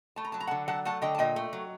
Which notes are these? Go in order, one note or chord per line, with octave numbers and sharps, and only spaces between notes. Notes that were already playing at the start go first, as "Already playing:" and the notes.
A3 A5
A#5
F#3 A5
A#5
D3 F#5 A5
F#3 F#5 A5
A3 F#5 A5
D3 D#5 G5
A5
A#2 D#5 G5
A3
F#3